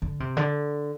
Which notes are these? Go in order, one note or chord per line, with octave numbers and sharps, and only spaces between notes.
D3
C3
D3